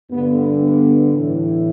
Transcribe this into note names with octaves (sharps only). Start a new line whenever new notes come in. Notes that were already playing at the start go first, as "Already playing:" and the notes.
G2 D3 B3
B3
A2 E3